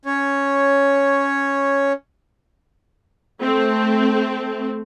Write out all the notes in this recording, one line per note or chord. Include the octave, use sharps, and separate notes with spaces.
C#4 C#5
A3 C4